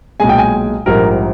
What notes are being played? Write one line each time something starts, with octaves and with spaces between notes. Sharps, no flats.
B1 A#2 G#3 G#5
G5
G#5
A#1 G#2 G3 A#4